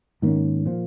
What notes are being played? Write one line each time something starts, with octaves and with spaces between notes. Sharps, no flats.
G#2 D#3 A#3 C#4
A#2 F3